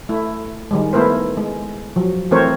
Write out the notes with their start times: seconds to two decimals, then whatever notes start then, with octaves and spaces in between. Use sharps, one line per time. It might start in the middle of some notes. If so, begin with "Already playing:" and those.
0.09 A3 E4
0.71 D#3 G3 G#3
0.93 A3 B3 E4 A#4 C5
1.37 G#3
1.96 F3 F#3
2.31 E3 A3 C4 A#4 C5 C#5